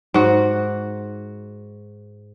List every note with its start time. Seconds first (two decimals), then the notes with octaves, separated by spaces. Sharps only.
0.14 G#2 F#4